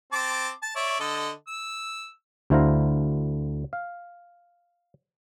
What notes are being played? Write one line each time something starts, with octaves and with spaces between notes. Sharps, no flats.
C4 A5 D6
A5
C#5 D5 E5
D3 A4 D#5
E6
D2 D3 E4 C5 F5 A#5
F5